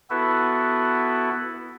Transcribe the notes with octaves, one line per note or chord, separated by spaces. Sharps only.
B3 E4 F#4 A4 B4